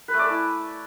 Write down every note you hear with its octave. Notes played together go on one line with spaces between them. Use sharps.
B4
A3
D5
A4
E4